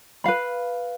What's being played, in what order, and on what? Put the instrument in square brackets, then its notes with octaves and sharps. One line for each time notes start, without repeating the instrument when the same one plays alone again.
[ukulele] B4 F5 B5